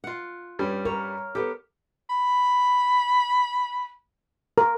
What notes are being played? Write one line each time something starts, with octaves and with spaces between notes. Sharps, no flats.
F4 F#5
G2 G3 C#4
A#4 C#5
B3 G4 A4
B5
A#4